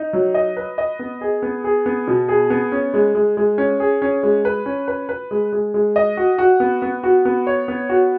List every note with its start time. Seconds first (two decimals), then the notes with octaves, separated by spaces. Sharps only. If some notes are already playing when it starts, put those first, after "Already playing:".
Already playing: D#4
0.13 F#3
0.35 D#5
0.57 B4
0.78 D#5
0.99 B3
1.21 G#4
1.42 B3
1.64 G#4
1.86 B3
2.08 B2
2.28 G#4
2.50 B3
2.72 C#4
2.94 G#3
3.15 G#3
3.37 G#3
3.58 C#4
3.80 G#4
4.02 C#4
4.23 G#3
4.45 B4
4.66 C#4
4.88 B4
5.09 B4
5.31 G#3
5.52 G#3
5.74 G#3
5.96 D#5
6.17 F#4
6.38 F#4
6.60 B3
6.82 B3
7.03 F#4
7.25 B3
7.47 C#5
7.68 B3
7.89 F#4